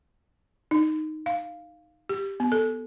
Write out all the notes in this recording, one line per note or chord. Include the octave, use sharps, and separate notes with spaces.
D#4
F5
G4
B3
A4